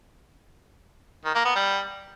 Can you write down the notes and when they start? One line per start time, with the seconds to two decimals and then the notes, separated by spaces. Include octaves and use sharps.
1.24 D#3
1.35 A#3
1.45 B3
1.55 G3